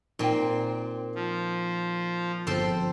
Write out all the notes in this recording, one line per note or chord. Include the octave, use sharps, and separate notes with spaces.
A#2 C4 D#4 G5
F3
G1 F3 C4 A4 C5